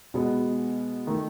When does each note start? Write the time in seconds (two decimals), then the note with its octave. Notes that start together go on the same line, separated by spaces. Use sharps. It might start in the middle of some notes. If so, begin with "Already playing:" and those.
0.14 B2 G#3 B3
1.07 D#3 A3 D#4